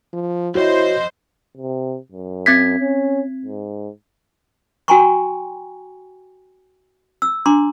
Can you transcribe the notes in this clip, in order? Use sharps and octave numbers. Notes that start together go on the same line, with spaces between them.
F3
F2 E4 F#4 C5 C#5 D#5
C3
F#2
C4 G#6 B6
C#4
G#2
F#4 G5 G#5 A#5 C6 C#6
E6
D4 A#5 C6 D6